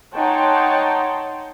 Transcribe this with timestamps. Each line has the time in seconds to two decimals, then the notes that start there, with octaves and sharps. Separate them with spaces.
0.14 D#4 C#5 F#5 G5 A5 C6